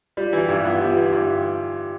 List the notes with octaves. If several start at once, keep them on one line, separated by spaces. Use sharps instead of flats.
G3 F4
E3
G4
G2
B3 F4
G3
F4
E3
G2 G4